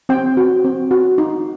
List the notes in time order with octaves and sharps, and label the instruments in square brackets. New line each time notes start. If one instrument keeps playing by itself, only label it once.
[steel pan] C4 G5
F#4
C4
F#4
D#4